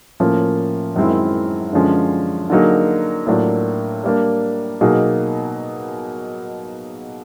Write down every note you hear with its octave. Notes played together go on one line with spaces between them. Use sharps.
A2 F3 A#3 C#4
F#2 D#3 G#3 C4 E4
F#2 D3 F3 G#3 C#4
D3 F#3 A#3 D#4 G#4
A2 F#3 A#3 D4 F4
G3 A#3 D4
B2 F#3 A#3 D#4 G#4